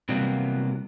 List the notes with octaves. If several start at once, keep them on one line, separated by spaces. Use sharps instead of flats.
C3 E3 F#3 G3 A#3 B3